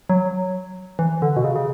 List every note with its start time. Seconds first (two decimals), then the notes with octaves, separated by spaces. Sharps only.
0.10 F#3
0.99 E3
1.22 D3
1.36 B2
1.44 C#3
1.56 C#3